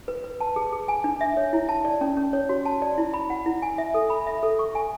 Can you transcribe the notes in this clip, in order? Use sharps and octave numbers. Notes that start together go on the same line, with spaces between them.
B4
B4
A5
G#4
G#4
G#5
D4
E5
C#5
E4
A5
D5
C#4
C#4
C#5
F#4
A5
D5
E4
B5
F#5
E4
G#5
E5
A4
B5
E5
A4
C#6
G#5